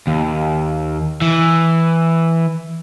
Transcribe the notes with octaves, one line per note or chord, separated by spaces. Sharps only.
D#2
E3